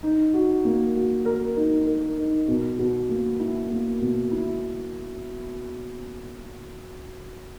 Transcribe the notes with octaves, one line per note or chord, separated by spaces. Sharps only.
D#4
F#4
A#3
F#4
A#4
D#4
A#4
D#4
B2
B2
A#3
E4
A#3
B2
E4